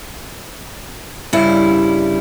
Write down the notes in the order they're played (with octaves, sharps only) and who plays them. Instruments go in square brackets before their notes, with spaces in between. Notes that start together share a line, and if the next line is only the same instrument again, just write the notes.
[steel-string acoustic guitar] G2 C#3 G3 E4